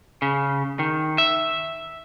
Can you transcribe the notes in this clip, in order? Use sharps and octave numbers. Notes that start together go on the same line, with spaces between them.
C#3
D#3
E5